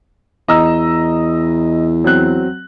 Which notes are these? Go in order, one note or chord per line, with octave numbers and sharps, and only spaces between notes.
E2 D#5 A#5 E6
F#3 C4 F#6